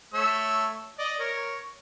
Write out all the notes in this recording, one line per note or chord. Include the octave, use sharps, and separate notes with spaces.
A3 C#5 E6
D5 D#5
A#4 C#5